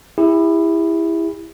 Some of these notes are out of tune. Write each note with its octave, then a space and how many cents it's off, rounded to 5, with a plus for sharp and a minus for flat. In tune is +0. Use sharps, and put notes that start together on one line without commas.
E4 +0 G4 +45